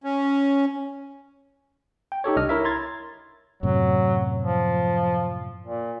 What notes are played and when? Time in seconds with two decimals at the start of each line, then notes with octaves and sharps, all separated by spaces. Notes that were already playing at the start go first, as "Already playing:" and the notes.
0.04 C#4
2.12 G5
2.24 D#4 G4 A4 C#5
2.36 C2 D4 D#5 F6
2.49 E4 A#4 C#5 E5
2.64 A#5 C6 G#6 A6
3.63 F#2 A2 C3 F#3
4.43 F3
5.63 A#2